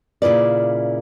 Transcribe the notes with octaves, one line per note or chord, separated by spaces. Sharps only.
A#2 C#3 E4 F4 B4 D5